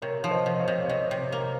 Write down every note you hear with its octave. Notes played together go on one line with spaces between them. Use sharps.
C3 A#4 C#5
F3 F5
C5 D#5
C3
D#5
C#5 F5
C3
C#5
C3 C5 D#5
C3
A#3